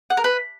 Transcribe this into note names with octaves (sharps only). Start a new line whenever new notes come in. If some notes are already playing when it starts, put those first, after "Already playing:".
F#5
A#4
B4